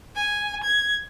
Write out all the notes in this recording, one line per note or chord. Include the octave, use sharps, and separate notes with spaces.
G#5
G#6